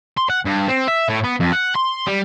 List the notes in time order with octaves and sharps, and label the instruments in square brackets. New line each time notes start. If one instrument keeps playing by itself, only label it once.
[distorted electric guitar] C6
F#5
G2
C4
E5
A2
B3
F2
F#5
C6
G3